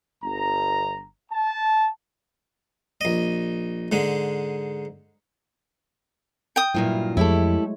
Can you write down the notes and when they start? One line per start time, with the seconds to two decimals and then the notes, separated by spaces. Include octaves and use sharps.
0.23 G1 A#5
1.31 A5
3.01 A#1 D#5
3.92 G#2 D3 G#3
6.56 G5 D#6
6.74 G2 A#2 F#3 E4 F4
7.17 F2 G#3 A3 E4 G4 A4 C#5